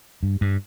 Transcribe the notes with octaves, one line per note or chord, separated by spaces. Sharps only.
G2
G2